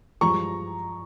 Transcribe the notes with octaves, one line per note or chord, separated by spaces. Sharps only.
G2 F3 G#3 A#5 C#6